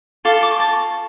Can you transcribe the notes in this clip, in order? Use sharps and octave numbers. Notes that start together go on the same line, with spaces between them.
F4 A4 D6
D6
C#6
A5